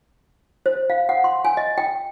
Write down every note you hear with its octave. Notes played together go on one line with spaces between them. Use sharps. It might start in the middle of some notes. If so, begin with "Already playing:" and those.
C5
F5
F#5
C6
G#5
D#5
G5